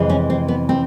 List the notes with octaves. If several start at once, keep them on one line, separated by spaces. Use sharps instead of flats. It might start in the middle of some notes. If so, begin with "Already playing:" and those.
Already playing: F2 C3 E3 G#3
C#4
C4
B3
C4